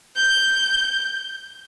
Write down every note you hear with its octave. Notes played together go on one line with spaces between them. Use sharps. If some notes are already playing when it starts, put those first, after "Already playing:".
G6